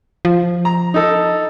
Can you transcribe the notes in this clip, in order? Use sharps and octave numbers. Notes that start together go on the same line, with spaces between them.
F3
A#5
D#4 A4